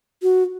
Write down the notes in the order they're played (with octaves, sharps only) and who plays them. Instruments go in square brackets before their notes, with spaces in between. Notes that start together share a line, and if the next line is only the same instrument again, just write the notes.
[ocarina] F#4